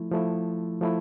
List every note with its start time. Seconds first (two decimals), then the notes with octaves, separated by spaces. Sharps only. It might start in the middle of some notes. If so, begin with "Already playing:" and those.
Already playing: F3 A3 E4
0.11 F3 A3 E4
0.81 F3 A3 E4